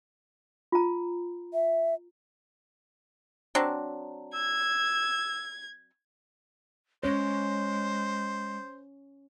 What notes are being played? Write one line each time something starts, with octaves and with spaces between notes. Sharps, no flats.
F4 A#5
E5
F#3 C4 D4
E6 G#6
G#3 C#4 C5 C#5